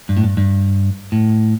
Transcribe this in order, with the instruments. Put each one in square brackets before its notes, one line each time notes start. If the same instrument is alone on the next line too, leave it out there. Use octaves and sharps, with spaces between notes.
[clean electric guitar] G2
A2
G2
G2
A2